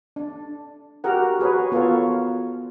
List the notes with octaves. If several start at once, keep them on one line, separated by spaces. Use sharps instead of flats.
D4
F#4 G4 A#4 F#5
F#4 G#4 B4 C#5
B3 F4 F#4 A4 A#4 C#5